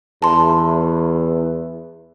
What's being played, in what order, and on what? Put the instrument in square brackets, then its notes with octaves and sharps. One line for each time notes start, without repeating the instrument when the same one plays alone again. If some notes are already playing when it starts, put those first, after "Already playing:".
[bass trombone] E2 [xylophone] A5 C6